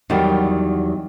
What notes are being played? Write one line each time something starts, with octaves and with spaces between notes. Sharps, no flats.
E2 D#3 F#3 G3